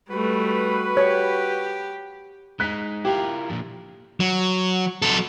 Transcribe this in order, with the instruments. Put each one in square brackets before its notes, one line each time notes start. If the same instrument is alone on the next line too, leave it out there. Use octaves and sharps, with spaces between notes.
[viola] G3 A3 [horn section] F#4 B4
[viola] G4 [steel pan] C#5
[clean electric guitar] G#3 D#4 [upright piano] F#6 B6
[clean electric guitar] E4 F4 A#4 [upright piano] G4
[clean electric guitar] A#2 D3 F3
[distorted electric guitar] F#3
F#3 A4